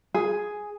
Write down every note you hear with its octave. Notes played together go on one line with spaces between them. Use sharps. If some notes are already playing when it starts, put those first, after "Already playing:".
G#4